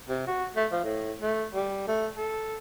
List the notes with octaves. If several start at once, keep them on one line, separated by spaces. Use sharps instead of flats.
C3
F#4
A3
F3
A2
A3
G3
A3
A4